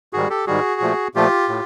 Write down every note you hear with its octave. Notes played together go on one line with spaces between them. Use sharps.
G#2 D#3 G3 F#4 G#4
G4 A4
G#2 D#3 G3 F#4 G#4
A#2 F3 A3
A#2 F3 A3 F4 G4
A2